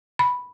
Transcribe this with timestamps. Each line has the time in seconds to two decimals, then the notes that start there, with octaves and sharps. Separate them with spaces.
0.19 B5